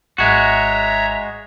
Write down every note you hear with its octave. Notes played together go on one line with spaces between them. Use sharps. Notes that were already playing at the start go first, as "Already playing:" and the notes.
G#1 G#3 F#4 C#5 E5 A#5